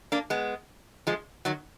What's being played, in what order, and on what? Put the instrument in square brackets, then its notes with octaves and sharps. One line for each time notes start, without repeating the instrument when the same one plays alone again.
[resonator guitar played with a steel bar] A#3 D4
G#3 B3
F3 G#3
D#3 F#3